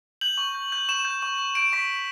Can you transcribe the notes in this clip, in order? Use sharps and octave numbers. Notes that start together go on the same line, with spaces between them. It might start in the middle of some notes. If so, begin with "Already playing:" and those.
G6 F#7
C#6
G6
G6
C#6 E7
G6
C#6
C#6
G6 D7
C#6 B6
C#6